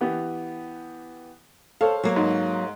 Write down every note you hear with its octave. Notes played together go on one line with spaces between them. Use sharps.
E3 B3 G4
A4 C5 C#5 F5
F#3 A#3
G#2